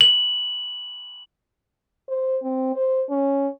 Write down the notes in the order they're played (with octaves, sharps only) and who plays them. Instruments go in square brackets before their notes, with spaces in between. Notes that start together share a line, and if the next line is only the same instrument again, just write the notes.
[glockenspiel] F#7
[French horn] C5
C4
C5
C#4